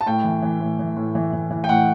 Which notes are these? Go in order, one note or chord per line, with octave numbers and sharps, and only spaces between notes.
A5
A2 G5
E3
E3
A2
E3
A2
E3
E3
E3
G5
A2 F#5